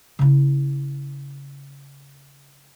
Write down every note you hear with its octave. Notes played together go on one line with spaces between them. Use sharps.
C#3 E4